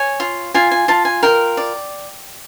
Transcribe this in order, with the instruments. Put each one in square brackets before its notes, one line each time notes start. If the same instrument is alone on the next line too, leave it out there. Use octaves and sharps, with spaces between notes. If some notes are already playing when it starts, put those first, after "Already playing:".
Already playing: [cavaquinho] C#5 G#5
F4
F4 G#5
G#5
F4 A5
G#5
A#4 G5
D5